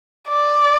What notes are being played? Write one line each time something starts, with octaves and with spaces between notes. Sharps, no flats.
D5